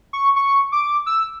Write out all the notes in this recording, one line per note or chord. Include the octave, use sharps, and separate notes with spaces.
C#6
C#6
D6
E6